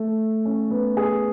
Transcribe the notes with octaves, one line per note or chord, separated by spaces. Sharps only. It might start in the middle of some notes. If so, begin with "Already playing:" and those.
Already playing: A3
C#4
B3
G#4